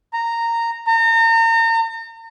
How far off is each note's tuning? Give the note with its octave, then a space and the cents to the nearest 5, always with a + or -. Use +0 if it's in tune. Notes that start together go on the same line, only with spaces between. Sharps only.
A#5 -10
A#5 -35